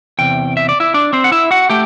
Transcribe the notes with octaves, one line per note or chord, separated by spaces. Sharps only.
E2 C3 G5
E5
D5
E4 E5
D4 D5
C4 C5
F#5
E4 E5
F#4 F#5
A3 G4 G5